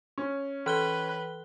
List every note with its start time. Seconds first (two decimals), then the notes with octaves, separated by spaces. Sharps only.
0.18 C#4
0.66 E3 B4 F#6 G7